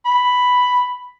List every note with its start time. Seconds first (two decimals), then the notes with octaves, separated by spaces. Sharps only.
0.06 B5